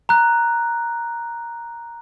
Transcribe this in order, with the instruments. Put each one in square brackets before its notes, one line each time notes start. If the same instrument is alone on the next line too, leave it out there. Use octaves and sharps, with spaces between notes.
[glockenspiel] A#5 F#6